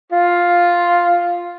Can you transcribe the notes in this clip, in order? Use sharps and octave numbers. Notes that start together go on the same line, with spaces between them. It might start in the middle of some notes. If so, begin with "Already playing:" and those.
F4